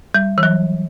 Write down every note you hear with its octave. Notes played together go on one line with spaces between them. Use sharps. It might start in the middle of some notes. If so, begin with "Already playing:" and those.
G3
E3
F#3